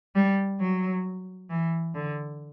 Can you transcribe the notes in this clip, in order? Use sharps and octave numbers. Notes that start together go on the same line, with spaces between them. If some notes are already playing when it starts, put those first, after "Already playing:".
G3
F#3
E3
D3